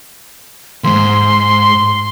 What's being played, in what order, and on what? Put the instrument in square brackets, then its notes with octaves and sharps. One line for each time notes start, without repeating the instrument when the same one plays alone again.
[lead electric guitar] D2 G#2 [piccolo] C6